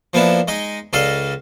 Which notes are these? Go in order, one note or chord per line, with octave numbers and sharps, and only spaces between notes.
F3 A#3 B3 D4 E4
G#3 D#4 D#5
C#2 A4 D5 D#5 F5